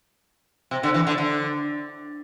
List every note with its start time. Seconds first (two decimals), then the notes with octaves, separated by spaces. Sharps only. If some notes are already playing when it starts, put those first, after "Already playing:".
0.71 C3
0.83 D3
0.94 E3
1.07 D3
1.18 D3